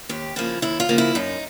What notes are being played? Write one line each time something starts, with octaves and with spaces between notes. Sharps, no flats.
D#2 G4
C#3 F3 A#3 E4
D#2 E4
F4
C#3 F3 A#3
E4
F#2 D#4